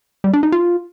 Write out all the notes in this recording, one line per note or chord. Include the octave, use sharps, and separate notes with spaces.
G3
D4
D#4
F4